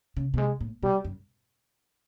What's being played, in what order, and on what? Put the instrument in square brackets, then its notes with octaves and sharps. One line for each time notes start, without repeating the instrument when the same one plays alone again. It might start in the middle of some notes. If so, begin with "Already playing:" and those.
[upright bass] C#3
B2
[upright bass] C3 [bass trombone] G#3
[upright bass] A2
[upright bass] B2 [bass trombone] G3
[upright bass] F#2